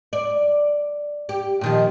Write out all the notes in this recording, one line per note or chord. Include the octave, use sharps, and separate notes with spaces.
D5
G4
A#2 D#3 F3